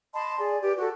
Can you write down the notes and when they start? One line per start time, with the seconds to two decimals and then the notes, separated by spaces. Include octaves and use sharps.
0.14 D#5 A5 B5 C6
0.39 G#4 D5
0.62 G4 B4 D5
0.78 F#4 A4